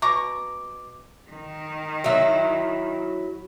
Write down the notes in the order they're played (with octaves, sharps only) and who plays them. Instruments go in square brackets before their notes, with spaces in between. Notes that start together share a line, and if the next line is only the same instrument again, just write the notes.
[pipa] B2 A#5 C#6 [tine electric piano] D6
[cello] D#3
[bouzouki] F#3 E4